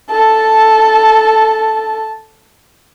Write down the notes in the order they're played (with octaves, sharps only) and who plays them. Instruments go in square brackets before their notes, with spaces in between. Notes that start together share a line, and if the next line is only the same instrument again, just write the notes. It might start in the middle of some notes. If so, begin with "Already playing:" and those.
[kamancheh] A4 A5